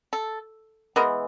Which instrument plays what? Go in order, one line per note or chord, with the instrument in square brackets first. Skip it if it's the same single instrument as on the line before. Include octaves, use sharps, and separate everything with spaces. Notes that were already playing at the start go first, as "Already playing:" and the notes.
[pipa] A4
E3 G#3 B3 A#4